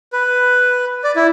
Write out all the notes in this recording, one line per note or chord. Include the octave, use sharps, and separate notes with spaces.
B4
D5
E4